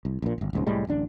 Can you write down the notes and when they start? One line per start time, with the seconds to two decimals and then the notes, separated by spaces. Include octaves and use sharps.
0.05 C2
0.22 A#1 A#2
0.38 D1 G1
0.53 D#1 C#2 G#2
0.66 C2 A2 G3 G#3
0.87 D1 A1 D4